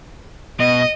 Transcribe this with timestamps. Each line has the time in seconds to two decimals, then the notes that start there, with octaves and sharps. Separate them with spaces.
0.60 B2 D#5